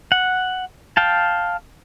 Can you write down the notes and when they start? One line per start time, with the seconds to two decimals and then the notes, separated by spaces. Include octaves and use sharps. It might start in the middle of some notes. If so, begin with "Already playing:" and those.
0.12 F#5
0.97 F5 G5 A5